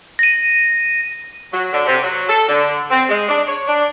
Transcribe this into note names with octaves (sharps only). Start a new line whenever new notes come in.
A#6 D#7
F#3
D3
C3
F#3
A4
D3
C4
G#3
D4
C#5
D4